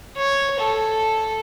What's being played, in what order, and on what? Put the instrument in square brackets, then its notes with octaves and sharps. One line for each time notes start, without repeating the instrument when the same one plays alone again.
[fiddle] C#5
A4